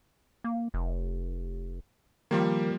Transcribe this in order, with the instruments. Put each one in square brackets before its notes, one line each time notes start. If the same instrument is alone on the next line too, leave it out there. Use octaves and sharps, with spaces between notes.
[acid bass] A#3
F1
[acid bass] D#3 [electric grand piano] F3 G3 A#3